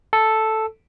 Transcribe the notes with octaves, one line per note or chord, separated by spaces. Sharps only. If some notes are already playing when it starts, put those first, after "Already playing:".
A4